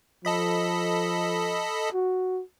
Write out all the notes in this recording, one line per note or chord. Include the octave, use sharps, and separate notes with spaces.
F3 A4 D#5 B5
F#4